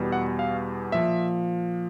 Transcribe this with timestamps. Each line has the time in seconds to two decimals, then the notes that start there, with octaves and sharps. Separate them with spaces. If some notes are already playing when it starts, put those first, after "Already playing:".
Already playing: E2 B2 G3
0.12 F#5
0.39 F5
0.92 A#2 F3 E5